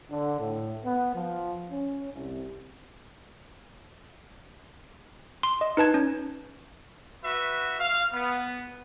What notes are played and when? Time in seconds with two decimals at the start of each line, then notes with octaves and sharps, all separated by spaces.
0.10 D3
0.40 A2
0.84 B3
1.15 F3
1.71 C#4
2.14 C2
5.43 C6
5.61 D#5
5.77 D#4 B4 A5 G#6
5.94 C#4
7.25 F#4 B4 E5
7.80 F5
8.14 B3